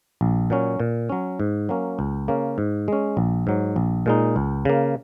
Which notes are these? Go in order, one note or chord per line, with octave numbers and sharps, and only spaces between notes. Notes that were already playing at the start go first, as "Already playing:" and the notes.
A#1
A#2 F#3 C#4
A#2
F#3 C#4
G#2
F#3 A#3 C#4
C#2
C#3 A#3 C#4
G#2
G#3 C#4
A#1
G#2 F#3
A#1
A#2 G#3 D#4
C#2
C#3 A#3